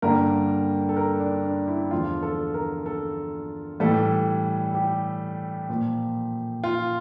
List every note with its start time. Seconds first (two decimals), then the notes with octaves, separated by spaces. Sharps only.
0.02 G2 D3 G3 A#3 A#4
0.89 A4
0.96 A#4
1.20 D4
1.45 D4
1.68 E4
1.91 E2 D3 F3 F4
2.23 A4
2.54 A#4
2.86 A4
3.80 A2 E3 G3 A4
4.74 G4
5.69 A#2 F3 A#3
6.64 F4